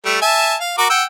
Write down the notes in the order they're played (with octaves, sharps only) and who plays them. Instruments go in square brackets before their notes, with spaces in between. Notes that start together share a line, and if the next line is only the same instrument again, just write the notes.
[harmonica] G3 A3
E5 G#5 A5
F5
F#4 A#4 D6
F#5 G5 E6